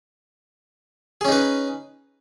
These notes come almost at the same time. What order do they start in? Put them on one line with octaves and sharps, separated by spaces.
G#4 C#4 D#4 B4